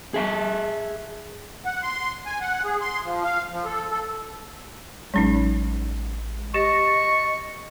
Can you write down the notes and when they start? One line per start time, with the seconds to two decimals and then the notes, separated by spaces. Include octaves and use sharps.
0.14 G#4 E5 A5
1.65 F#5
1.83 C6
2.26 G#5
2.41 F#5
2.64 G#4
2.81 C6
3.04 F3
3.24 F5
3.52 F3
3.65 A4
3.90 A4
5.14 A1 F#3 G#3 C#4 D#4
6.54 G4 D#5 C#6 A6 A#6